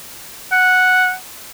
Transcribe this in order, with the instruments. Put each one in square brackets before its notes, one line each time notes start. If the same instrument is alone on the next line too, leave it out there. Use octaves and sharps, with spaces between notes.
[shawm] F#5